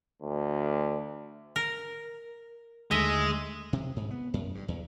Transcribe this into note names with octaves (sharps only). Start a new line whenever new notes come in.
D2
A#4
D#2 D3 G#3 A3 D#5 E5
C3
G#2
B3
F#2
G2
E2